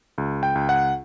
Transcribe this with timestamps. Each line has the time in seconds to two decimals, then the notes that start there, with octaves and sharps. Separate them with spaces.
0.18 C#2
0.43 G5
0.55 C#2
0.69 F#5